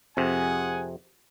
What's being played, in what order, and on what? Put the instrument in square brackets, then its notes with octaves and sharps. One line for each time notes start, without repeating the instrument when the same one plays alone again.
[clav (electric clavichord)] F2 C3 [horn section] G#4 F#5 G#5